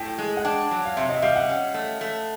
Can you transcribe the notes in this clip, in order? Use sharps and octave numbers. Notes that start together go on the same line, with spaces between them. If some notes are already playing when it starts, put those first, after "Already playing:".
Already playing: A2 G5
G#3
F#5
D4 G5
F#3
F5
C3 E5
D#5
E5
G3 F5
F#5
C#4
A3
A3